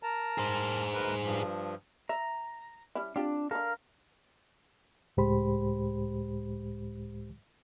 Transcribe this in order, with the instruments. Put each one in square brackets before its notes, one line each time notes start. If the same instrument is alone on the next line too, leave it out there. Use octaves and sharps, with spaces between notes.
[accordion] A#4 A5 A#5
[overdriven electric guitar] G#4 C5
[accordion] D2 A#4 B4
G2 F3
[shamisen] E5 [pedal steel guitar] A#5
[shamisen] G3 C#4 E4
[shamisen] C4 F4 G4 [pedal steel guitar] D4
[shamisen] D3 D#3 A4 [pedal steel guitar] A#4 F5
[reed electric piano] C#2 A2 G#3 G4 C5 B5